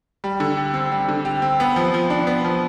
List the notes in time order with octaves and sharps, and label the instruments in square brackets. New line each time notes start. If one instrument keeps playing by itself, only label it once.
[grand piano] G3
D3
G4
C4
G3
D3
G4
C4
B3
F3
F3
D4
B3
F3